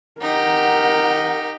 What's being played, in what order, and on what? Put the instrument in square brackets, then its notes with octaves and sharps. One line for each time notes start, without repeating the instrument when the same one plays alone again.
[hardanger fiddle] D#4 G4 [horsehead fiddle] A#4 F#5